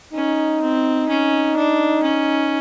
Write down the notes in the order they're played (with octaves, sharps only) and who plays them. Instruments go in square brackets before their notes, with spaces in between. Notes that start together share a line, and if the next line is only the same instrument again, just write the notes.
[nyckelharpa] C#4 [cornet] D#4
[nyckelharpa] C4
C#4
D4
C#4